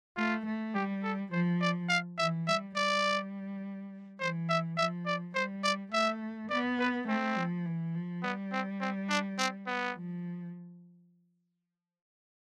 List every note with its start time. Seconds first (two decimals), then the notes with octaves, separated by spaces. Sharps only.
0.17 A3 F4
0.46 A3
0.75 G3 G4
1.04 A4
1.32 F3 C5
1.61 D5
1.89 F5
2.18 E3 E5
2.48 G3 E5
2.76 G3 D5
4.20 E3 C5
4.49 E5
4.77 F3 E5
5.06 D5
5.35 G3 C5
5.64 D5
5.93 A3 E5
6.50 B3 D5
6.80 B4
7.08 A3 C4
7.37 F3
7.65 E3
7.95 F3
8.23 G3 B3
8.52 C4
8.81 C4
9.10 D4
9.39 C4
9.67 B3
9.96 F3